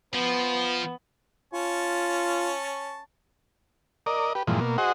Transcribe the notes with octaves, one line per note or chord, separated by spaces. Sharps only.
F3 B3
C#4 F4 A5 C#6
A#4 D5 D#5
G4 B4
G2 A#2 E3 F3 G#3
B2 A#3
F#4 G#4 C5 D#5 F#5